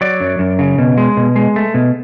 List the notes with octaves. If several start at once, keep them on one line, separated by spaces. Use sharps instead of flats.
F#3 D5
F#2
F#2
C#3
B2
G#3
B2
G#3
A3
B2